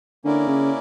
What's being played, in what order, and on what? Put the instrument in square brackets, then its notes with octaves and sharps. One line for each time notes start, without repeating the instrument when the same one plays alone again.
[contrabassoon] D3 [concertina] A#3 C#4 E4 A#4 D5
[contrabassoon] C#3